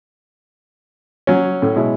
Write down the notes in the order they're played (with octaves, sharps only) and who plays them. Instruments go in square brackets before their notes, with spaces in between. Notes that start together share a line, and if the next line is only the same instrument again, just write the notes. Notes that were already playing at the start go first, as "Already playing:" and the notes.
[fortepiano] F#3 C#4
[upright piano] A2
B2 G#3 E4